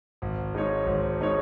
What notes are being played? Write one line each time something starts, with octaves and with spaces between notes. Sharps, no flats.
G#1
G#2 G#3 D#4 C#5
G#1
G#3 D#4 C#5